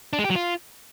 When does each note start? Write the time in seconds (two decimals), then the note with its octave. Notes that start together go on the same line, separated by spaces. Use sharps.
0.13 D4
0.19 G#3
0.24 G4
0.30 F#3
0.36 F4